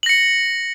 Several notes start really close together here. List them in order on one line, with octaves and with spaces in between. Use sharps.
F#7 A#6 C#7